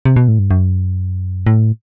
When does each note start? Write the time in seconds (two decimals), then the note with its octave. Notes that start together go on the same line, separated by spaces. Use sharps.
0.05 C3
0.16 B2
0.28 A2
0.39 G2
0.51 F#2
1.47 A2